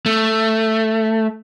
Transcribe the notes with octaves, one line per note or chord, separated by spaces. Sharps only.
A3